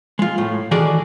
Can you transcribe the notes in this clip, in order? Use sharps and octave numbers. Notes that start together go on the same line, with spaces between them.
G#3 F4
A2
D#3 E3 F#4 G#4 A4 D5